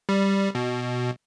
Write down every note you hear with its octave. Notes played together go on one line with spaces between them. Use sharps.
G3
B2